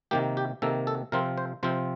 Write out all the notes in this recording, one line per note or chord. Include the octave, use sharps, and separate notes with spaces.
C3 D#3 A#3 G4
G4
C3 D#3 A#3 A4
A4
C3 F3 C4 F4 A#4
C5
C3 F3 C4 F4 C5